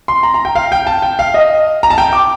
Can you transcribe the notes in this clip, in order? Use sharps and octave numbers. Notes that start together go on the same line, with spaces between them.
C6
A#5
A#5
G5
F5
G5
A5
G5
F5
D#5
A#5
A5
G5
D6